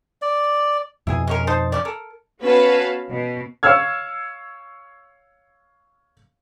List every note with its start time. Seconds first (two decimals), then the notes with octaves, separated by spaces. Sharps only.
0.22 D5
1.07 F2 B2 E4 G#4 G#5
1.27 G#3 C#4 A#4
1.47 D#4 C5 A5
1.72 C#4 D4 D5
1.85 A4 A#4
2.40 B3 C#4 F#4 B4 F5 A5
3.09 B2
3.63 C#5 F5 E6 F6 G#6